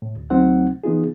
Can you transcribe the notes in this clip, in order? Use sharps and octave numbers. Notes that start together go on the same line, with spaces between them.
A2
D2
D2 F#3 A3 C4 D#4 F#5
E3 B3 D#4 F4 G#4